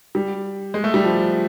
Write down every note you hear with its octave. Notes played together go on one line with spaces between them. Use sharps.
G3
G#3
A3
G3
F3